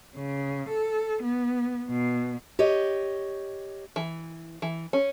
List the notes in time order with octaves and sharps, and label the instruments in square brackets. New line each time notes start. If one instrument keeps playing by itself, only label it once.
[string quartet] C#3
A4
B3
B2
[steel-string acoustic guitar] G4 C#5 D#5
[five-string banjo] E3
E3
C#4